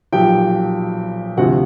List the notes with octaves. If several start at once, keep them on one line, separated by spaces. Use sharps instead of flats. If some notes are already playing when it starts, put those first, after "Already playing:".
B1 A#2 F3 G4 G5
D2 C3 F3 F#4 F#5